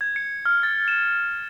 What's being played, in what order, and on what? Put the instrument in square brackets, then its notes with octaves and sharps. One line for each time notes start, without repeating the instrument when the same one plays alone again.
[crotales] G#6
C#7
F6
A6
E7